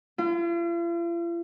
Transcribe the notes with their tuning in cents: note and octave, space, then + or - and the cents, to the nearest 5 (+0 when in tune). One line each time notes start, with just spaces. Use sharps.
F4 -45